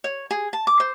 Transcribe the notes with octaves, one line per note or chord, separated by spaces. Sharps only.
C#5
G#4
A5
D6
C5